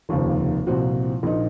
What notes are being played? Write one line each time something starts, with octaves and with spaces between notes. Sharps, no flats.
F1 D#2 C#3 F3
C2 A#2 F3 C4 F#4
A#1 A#2 F3 A#3 D#4